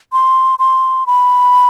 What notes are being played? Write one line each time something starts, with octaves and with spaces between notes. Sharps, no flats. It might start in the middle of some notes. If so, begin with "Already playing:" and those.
C6
C6
B5